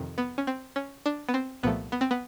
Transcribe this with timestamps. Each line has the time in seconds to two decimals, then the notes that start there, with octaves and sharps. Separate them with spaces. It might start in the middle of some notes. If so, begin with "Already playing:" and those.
Already playing: F2 C3 D#3
0.18 B3
0.38 C#4
0.47 C4
0.76 C#4
1.06 D4
1.29 B3
1.34 C4
1.63 C2 A#2 F3 A3 B3
1.92 B3
2.01 C4
2.11 B3